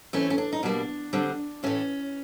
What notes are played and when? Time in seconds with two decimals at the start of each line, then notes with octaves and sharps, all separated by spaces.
0.13 E3 A3 C4 C#4
0.30 C#4
0.38 D4
0.52 D#4
0.63 B2 G3 A#3 D4
1.13 D3 G3 C4
1.63 A2 E3 A3 C#4